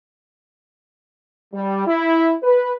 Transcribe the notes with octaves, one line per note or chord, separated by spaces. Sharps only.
G3
E4
B4